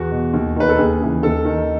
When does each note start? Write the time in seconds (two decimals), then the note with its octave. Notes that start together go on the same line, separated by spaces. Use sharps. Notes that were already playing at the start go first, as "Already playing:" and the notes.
Already playing: E2 F#4
0.11 B2
0.33 D#2
0.56 D#3 B4
0.69 A4
0.78 D#2 G#4
1.00 C#3 E3
1.23 D#2 A4
1.45 D#3